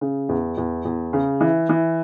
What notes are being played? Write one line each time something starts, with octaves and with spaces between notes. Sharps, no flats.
C#3
E2
E2
E2
C#3
E3
E3